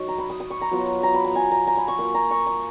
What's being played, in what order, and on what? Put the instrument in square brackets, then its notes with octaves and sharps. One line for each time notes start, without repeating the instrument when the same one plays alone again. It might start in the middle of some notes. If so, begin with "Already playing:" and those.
Already playing: [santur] F#3 D#4 C#6
A#5
B5
D#6
D#6
C#6
A#5
F#3 B3 F4
A#5
B5
A#5
G#5
A#5
A#5
B5
C#6
A#3 F4 C#6
A#5
C#6
D#6